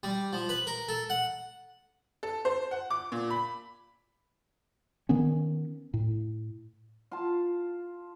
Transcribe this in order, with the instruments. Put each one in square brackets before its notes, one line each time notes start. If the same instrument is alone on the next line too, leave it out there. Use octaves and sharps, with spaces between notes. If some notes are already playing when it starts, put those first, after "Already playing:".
[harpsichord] G3
F3
B4
A#4
A4
F#5
[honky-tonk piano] A4
C5
F#5
D6
A#2
B5
[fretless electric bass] D#3 B3 C#4
A2
[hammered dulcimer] F4 A5